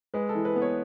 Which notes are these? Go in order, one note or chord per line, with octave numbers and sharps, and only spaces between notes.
G#3 B4
A4
E3
B4
B3
C#5